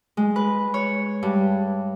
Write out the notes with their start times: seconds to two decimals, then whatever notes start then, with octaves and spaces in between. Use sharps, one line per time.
0.17 G#3
0.36 B4
0.74 C#5
1.23 G2